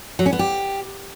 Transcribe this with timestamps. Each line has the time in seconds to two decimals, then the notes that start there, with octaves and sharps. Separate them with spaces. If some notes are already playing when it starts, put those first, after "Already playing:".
0.19 F#3
0.26 C#4
0.33 B3
0.39 G4